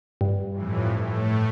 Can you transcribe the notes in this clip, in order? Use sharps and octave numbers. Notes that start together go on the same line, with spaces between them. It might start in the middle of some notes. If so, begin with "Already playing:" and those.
G2
F2 A2 E3
A2 A3